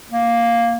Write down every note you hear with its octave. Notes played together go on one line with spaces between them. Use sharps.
A#3